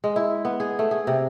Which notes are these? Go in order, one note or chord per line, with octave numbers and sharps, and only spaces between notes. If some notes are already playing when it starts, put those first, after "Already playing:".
G#3
E4
B3
G#4
A3
G#4
C3